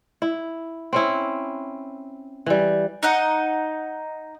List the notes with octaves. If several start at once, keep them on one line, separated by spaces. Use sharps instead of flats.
E4
C4 C#4 E4
E3 G3
D#4 D#5 F#5